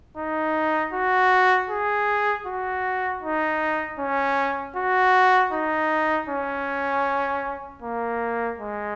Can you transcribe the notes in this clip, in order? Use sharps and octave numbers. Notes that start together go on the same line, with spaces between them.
D#4
F#4
G#4
F#4
D#4
C#4
F#4
D#4
C#4
A#3
G#3